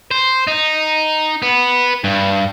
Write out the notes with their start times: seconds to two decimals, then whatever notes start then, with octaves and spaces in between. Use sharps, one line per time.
0.11 C5
0.47 D#4
1.42 B3
2.04 G2